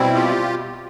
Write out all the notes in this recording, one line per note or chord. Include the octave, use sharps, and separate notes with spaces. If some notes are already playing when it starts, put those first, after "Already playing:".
Already playing: B2 G3 C4 E4
F4 G4